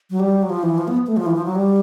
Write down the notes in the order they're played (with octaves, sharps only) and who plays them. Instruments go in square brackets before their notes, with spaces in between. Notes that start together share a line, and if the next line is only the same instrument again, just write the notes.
[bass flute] F#3
G3
F#3
F3
E3
F3
B3
A3
F3
E3
F3
F#3
G3